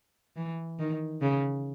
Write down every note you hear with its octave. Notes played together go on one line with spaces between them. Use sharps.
E3
D#3
C#3